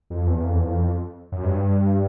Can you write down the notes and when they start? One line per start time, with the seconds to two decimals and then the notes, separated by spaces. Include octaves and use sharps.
0.10 F2
0.27 E2
0.44 F2
0.55 E2
0.67 F2
1.32 F#2
1.44 G2